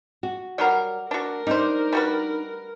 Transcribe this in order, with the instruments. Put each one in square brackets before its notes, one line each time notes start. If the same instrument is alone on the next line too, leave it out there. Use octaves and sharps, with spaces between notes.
[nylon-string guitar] F#4
[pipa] F#3 G3 A#4 [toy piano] D5 F#5
[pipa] D4 F#4 [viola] A#4
[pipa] G3 C5 [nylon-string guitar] D4 D#4
[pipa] G3 F#4 B4